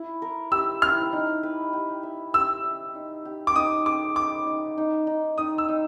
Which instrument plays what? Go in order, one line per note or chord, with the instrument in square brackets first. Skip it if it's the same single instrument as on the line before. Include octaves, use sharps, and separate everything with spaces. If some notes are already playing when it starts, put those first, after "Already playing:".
Already playing: [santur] E4
A#4
[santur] G4 [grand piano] E6
[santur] E4 [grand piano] F6
[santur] D#4
B4
G4
E5
[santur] G4 [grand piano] E6
[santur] E5
D#4
G4
[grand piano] D6
[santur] D#4 [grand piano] D#6
[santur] G#4 [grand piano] D6
[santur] B4 [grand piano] D6
[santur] D#4
D#4
D#4
[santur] D#4 [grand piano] D#6
[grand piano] E6
[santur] D#4